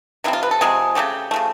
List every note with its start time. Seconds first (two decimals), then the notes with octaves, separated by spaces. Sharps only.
0.24 C3 F3 G#3 C4 E4
0.33 F4
0.43 B4
0.51 A4
0.61 C3 F3 G#3 C4 G#4
0.95 C#3 F3 A3 G4
1.31 C#3 F3 A3